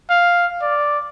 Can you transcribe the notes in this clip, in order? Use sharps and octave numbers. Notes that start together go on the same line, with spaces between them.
F5
D5